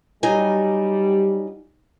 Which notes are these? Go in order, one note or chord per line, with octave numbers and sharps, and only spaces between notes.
F#3 G3 D#4 G#5